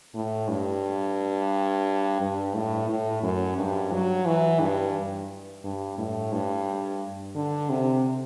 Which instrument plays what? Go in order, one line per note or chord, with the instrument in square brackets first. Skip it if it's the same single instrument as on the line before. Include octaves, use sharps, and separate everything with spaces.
[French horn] A2
G2
G2
A2
A2
F#2
G2
F#3
E3
G2
G2
A2
G2
D3
C3